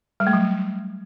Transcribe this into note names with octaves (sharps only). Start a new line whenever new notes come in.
G3
A3
F#3